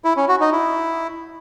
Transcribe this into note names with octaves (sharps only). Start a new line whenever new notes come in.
E4
C#4
F#4
D#4
E4